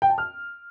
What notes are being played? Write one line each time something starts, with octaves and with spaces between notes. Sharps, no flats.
G5
A5
F6